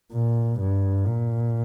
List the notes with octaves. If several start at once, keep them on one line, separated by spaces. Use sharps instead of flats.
A#2
G2
A#2